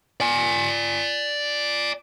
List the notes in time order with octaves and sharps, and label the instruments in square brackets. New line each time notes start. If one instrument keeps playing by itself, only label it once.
[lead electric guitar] D5 G#5